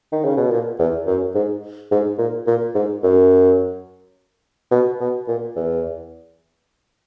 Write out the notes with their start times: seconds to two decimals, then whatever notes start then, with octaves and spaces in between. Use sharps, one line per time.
0.12 D#3
0.24 C#3
0.37 B2
0.50 A#2
0.79 E2
1.07 F#2
1.34 G#2
1.91 G#2
2.18 A#2
2.47 A#2
2.75 G#2
3.03 F#2
4.71 B2
5.00 B2
5.28 A#2
5.56 E2